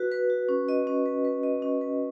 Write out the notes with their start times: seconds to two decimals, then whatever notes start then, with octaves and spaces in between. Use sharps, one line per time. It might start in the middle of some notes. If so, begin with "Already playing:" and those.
Already playing: F#4 B4
0.12 B4
0.30 F#4
0.49 C#4
0.69 D#5
0.87 C#4
1.06 B4
1.25 B4
1.43 D#5
1.62 C#4
1.81 B4